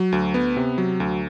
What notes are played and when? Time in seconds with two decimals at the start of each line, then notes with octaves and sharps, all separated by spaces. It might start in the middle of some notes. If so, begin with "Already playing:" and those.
Already playing: F#3
0.12 D2
0.34 B3
0.57 C3
0.78 F#3
1.00 D2